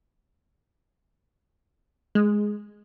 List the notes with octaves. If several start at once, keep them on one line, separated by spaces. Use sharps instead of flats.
G#3